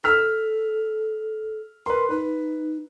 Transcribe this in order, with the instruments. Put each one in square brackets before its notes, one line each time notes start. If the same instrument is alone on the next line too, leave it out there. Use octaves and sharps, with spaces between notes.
[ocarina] A4 [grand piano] E6 F6 B6
[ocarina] A#4 [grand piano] B4 C6
[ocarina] D#4 [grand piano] B4